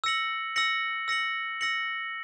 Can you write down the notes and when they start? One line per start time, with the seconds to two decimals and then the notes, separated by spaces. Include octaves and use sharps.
0.04 E6 A#6 C#7 F#7
0.56 E6 A#6 C#7 F#7
1.08 E6 A#6 C#7 F#7
1.61 E6 A#6 C#7 F#7